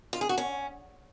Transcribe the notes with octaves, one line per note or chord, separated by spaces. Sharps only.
F4
G#4
F#4
C#4